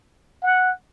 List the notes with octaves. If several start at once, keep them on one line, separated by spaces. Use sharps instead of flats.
F#5